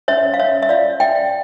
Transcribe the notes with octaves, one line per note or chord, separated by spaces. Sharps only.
C#4 C#5 E5
F5
C#4 C#5 E5
E5
F4 D5 F5
C#4 E5 G5